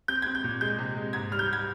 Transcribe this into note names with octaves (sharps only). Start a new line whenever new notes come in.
C4 G6
C4 G#6
G6
A#2
G#3 G6
C3
G#3
G#2 G#6
G3 F6
G6
G3 G#6